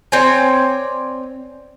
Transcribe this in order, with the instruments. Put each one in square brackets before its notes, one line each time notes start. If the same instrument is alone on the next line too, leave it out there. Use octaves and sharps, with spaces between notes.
[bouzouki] C4 C#5 D5 G#5